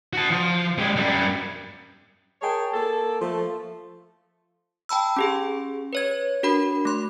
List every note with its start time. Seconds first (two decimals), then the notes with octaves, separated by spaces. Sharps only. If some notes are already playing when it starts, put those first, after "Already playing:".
0.13 F#4 A5
0.31 F3
0.78 G#3 G4
0.96 F#2 G3
2.42 G#4 A#4 C#5 G5 A5
2.74 A#3 A4
3.20 F3 A3
4.89 G5 A5 B5 E6
5.17 C#4 G4 G#4
5.93 B4 C#5 G#6
6.43 D4 F#4 A#4 B5
6.85 A3 C6